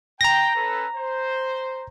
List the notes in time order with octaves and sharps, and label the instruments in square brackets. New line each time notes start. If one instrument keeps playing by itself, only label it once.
[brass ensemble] G5 [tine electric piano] A#5 A#6
[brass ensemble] C#4 A4 B4
C5